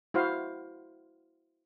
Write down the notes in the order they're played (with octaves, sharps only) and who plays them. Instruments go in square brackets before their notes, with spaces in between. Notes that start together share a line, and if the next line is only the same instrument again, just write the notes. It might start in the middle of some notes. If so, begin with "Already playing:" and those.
[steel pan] E4 F#4 C5 F5